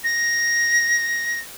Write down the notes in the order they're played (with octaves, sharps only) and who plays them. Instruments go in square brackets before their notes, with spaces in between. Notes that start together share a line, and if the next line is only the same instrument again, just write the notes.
[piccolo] A#6